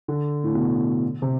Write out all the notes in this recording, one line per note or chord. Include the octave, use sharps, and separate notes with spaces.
D3
A2
B2
C3